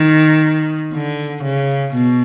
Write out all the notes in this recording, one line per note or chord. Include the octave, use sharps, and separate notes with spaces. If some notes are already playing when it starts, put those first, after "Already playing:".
Already playing: D#3
D3
C#3
B2